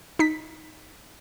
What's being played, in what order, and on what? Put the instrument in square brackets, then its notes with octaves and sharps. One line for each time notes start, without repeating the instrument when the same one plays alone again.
[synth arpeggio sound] D#4 B6